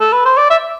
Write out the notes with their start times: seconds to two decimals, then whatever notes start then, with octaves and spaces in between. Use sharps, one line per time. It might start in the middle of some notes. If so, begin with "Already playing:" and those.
0.00 A4
0.13 B4
0.25 C5
0.37 D5
0.50 E5